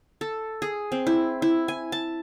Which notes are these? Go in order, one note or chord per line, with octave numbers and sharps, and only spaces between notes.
A4
G#4
C4
E4
E4
G#5
A5